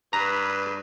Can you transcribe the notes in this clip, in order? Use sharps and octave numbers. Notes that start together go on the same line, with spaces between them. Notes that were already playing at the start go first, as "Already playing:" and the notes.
G2 B4 A#5